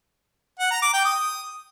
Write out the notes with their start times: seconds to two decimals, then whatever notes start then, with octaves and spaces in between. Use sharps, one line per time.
0.60 F#5
0.71 A#5
0.82 D6
0.94 G5
1.05 D#6